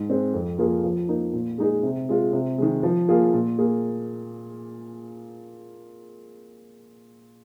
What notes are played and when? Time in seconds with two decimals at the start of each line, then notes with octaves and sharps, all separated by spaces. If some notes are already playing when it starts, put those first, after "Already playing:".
Already playing: G#2
0.10 G#3 C4
0.33 F2
0.58 F3 A#3 F4 G#4
0.84 F3
1.09 A#3 D#4
1.33 A#2
1.58 G#3 D#4 G#4
1.83 C3
2.09 G#3 F4 G#4
2.33 C3
2.58 D#3 G#3
2.83 F3
3.08 A#3 F4 G#4
3.33 A#2
3.58 A#3 G#4